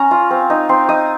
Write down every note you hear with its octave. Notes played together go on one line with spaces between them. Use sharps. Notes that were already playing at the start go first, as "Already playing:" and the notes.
Already playing: C#4 A#5
F4
C4
D#4
C4 C6
D#4 D#6